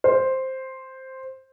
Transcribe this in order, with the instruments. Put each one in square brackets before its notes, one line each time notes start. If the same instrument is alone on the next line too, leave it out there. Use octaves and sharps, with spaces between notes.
[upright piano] C5